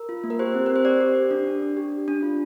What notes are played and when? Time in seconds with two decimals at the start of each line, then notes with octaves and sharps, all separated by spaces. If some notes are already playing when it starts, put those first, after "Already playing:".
Already playing: A#4
0.09 F4
0.24 A#3
0.30 A#4
0.39 G4 C5
0.55 C4
0.66 G4 A#4
0.76 C5
0.85 G4 D5
1.00 G4
1.15 G4
1.31 D4
1.47 D4
1.62 D4
1.77 G4
1.92 D4
2.08 D4
2.23 F4